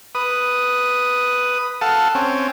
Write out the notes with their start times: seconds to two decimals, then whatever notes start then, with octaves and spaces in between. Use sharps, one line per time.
0.15 B4 D#6
1.81 A4 F5 F#5 A5
2.15 C4 C#4